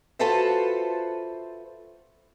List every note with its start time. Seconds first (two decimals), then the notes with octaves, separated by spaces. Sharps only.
0.19 F4 F#4 A4 B4 C5 E5